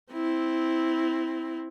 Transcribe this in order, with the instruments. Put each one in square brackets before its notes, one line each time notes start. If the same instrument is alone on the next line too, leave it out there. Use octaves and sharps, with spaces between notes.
[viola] C4 E4